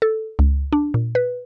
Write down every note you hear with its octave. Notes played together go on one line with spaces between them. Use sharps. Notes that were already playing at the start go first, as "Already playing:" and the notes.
A4
C#2
D4
A#2
B4